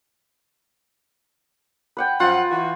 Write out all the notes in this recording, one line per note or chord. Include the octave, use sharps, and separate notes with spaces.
B4 F#5 G5
F#2 F3 F4 F#5
E3 F#4